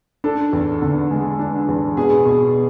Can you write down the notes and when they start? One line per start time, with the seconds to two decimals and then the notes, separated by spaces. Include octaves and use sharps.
0.24 D4 A4
0.53 E2
0.82 D3
1.11 G#3
1.39 D4
1.68 E2
1.97 B2 G#4
2.25 B2